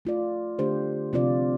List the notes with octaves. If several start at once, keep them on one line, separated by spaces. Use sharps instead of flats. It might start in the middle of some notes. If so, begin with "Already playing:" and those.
A3 F4 D5
D3 A3 D4 G4 C5
C3 F3 C4 F4 D5